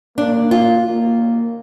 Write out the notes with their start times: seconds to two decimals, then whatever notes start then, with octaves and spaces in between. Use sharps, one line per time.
0.17 A#3 D4
0.51 F4
0.85 A#3